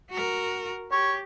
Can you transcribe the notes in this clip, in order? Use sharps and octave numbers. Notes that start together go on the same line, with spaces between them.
F#4 A#4
G4 C#5